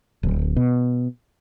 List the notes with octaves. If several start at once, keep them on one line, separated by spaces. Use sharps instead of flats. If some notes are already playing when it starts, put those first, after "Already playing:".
D1
B2